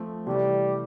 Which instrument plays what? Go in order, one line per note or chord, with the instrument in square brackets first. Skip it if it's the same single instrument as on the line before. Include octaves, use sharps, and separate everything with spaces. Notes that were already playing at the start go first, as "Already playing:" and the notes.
Already playing: [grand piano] F3 A3 C4
[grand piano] C3 E3 A3 [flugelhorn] G3